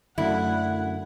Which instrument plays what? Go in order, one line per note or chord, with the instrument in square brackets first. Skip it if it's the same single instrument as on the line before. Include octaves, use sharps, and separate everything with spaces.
[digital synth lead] F#2 [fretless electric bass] D3 A3 [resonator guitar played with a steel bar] E4 [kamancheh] F#5